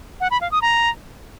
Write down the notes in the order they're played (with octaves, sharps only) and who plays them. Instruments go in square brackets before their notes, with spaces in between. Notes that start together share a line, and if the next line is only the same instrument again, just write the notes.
[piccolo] F#5
B5
F5
D#6
A#5